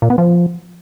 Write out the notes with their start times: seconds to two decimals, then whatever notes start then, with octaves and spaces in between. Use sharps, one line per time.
0.02 A#2
0.10 B3
0.18 F3